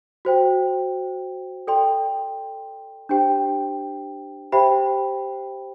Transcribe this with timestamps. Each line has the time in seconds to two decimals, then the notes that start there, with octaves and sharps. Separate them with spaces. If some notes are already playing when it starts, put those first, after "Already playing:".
0.25 F#4 C5 G5
1.67 A4 D5 G5 C6
3.09 D4 G4 C5 G5
4.52 G4 C5 E5 G5 B5